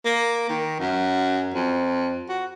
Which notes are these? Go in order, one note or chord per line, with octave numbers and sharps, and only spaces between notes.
A#3
D#3
F#2
F2
F#4